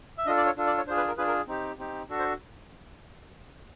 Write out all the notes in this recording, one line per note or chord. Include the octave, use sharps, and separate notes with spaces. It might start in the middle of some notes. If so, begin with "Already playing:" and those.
E5
D4 F4 A4 D#5
D5
C#5
D4 F4 A4
D5
C#5
D4 F4 G#4 C5
B4
A#4
D4 F4 G#4 B4
A#4
C4 D#4 G4
C4 D#4 G4
D4 F#4 A4
C5